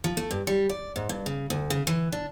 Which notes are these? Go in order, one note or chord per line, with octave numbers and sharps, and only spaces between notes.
F3
A3
G2
G3
D5
G#2
G2
C#3
D2
C#3
E3
D4